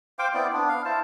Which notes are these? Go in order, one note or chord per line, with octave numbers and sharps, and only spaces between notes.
C5 F5 G5 D6
B3 C4 E4 D5
B3 D4
F5
E4 C5 A5